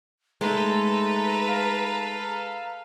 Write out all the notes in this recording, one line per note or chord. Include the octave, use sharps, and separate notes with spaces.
G#3 A3 D#4 A4 B4 A#5
F5